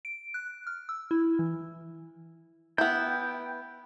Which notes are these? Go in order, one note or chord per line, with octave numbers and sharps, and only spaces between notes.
D7
F#6
F6
E6
E4
E3
B3 E4 G5